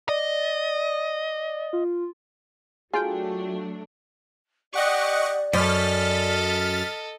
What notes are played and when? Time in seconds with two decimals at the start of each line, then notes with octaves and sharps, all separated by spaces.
0.09 D5 D#5
1.73 F4
2.94 F#3 A3 D4 F4 F#4 G#4 G5
4.73 G4 D5 D#5 F#5 C#6
5.53 F#2 A4 D#5 F6 A6 B6